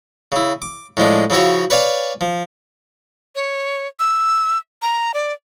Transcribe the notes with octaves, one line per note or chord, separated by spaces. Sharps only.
C#3 E4
D6
A2 F3 G#3 D4
C#3 F3 E4 F#4 C#5
B4 C#5 D5 F5 G#5
F3
C#5
E6
A#5
D5